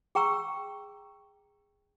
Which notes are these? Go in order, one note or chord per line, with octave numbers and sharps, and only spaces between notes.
G#4 G5 A#5 C#6 E6